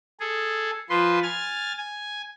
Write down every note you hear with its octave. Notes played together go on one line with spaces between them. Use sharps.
G#4 A4
F3 B4 C6
G#5 F6 A6
G#5